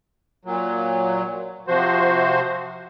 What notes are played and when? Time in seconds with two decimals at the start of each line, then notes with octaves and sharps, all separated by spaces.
0.45 A#2 F#3
1.68 C3 F3 F#4 C5